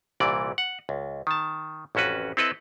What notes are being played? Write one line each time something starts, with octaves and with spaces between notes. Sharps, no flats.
C2 A#2 E3 D5
F#5
C#2
D#3 A5
A1 F2 C#4 F#4 B4
C4 E4 A4 B4 D#5